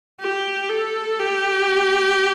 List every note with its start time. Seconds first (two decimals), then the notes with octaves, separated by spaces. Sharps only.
0.20 G4
0.69 A4
1.19 G4